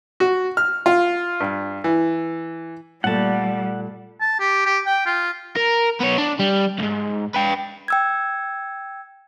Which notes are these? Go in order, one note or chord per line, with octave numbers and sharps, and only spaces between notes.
F#4
F6
F4
G2
E3
A#2 G3 A3 F#5 A5
A5
G4
G4
G5
F4
A#4
B3 C#5
D4
G3
C2 G#2
B4 G5
G5 E6 G#6